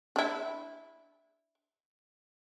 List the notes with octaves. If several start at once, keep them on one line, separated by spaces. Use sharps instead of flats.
D4 E4